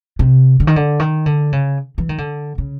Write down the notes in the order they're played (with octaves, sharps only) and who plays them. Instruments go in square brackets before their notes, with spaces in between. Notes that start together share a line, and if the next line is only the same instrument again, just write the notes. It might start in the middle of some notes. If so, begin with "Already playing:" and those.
[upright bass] C3
D3
D#3
D3
D#3
D3
C#3
E3
D#3
D3
C#3